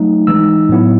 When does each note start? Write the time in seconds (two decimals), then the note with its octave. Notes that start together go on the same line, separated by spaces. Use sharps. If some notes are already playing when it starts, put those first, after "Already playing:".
Already playing: F#3 A3 D#4
0.27 E3 G#3 D#4 E6
0.69 A2 F#3 B3 E4